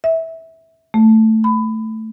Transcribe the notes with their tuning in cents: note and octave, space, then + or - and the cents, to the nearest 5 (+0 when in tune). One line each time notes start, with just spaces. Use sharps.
E5 -15
A3 +5
B5 +20